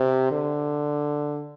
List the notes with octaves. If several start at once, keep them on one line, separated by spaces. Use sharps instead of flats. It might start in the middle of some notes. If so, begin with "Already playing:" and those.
Already playing: C3
D3